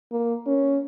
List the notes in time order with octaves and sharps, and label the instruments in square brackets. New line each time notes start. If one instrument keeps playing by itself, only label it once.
[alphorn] A#3
C#4